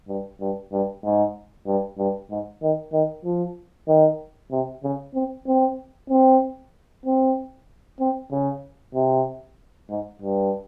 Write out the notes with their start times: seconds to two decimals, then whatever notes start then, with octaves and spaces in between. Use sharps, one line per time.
0.08 G2
0.40 G2
0.72 G2
1.04 G#2
1.67 G2
1.98 G2
2.30 G#2
2.62 D#3
2.93 D#3
3.24 F3
3.88 D#3
4.51 C3
4.84 C#3
5.14 C4
5.47 C4
6.10 C4
7.06 C4
8.00 C4
8.31 C#3
8.95 C3
9.90 G#2
10.22 G2